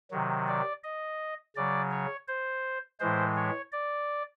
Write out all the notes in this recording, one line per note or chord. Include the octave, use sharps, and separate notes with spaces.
C3 D#3 F#3
D5
D#5
C#3 F#3 D5
C#5
C5
A2 E3 G#3 C5
C#5
D5